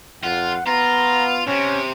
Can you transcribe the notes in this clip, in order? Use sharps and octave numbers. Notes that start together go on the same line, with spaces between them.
F2 F4 F#5
B3 F4 A#5
C3 C#4